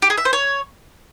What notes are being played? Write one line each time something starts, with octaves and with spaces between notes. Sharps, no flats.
G4
G#4
E5
C5
C#5